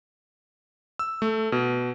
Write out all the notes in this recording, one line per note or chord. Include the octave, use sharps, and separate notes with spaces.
E6
A3
B2